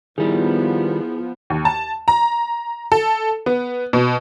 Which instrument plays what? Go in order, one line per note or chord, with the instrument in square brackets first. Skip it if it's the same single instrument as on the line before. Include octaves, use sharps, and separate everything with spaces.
[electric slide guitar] D#3 G3 [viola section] F3 B3 [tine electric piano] E4 G#4
[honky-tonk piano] D#2
A5
A#5
A4
B3
B2